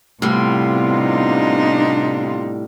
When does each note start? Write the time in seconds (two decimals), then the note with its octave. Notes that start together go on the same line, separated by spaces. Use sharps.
0.22 A2 C3 G3 B3 F4
0.90 D4 D#4